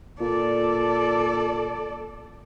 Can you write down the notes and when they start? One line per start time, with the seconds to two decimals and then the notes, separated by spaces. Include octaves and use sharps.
0.21 A#2 A4 D5